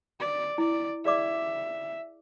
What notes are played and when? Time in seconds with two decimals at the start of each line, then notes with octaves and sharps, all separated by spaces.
0.20 D5
0.58 E4 D5
1.05 G#4 D5 E5 D6